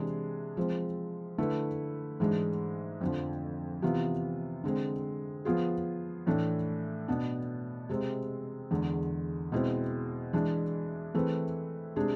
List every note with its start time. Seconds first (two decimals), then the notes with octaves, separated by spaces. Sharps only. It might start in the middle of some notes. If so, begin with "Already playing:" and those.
Already playing: C3 E3 G#3 D4 G#4
0.57 F3 G#3 C4
1.38 D3 A3 E4 B4
2.20 G#2 E3 G#3 D4
3.01 F2 D3 F3
3.82 C3 E3 B3 F4
4.64 D3 G#3 C4
5.45 F3 B3 F4 G#4
6.26 A2 E3 A3 D4
7.08 B2 B3 D4
7.89 C3 G#3 C4
8.71 E2 D3 G#3
9.52 B2 G#3 C4 E4
10.33 E3 G#3 D4
11.14 E3 A3 C4 G#4 B4
11.96 C3 G#3 D4 G#4